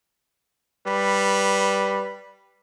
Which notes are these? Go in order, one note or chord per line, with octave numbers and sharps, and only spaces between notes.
G3 B4